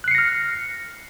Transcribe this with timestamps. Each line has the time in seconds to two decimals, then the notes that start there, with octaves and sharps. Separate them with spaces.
0.04 F#6
0.08 C7
0.11 C#7
0.15 A#6
0.18 F6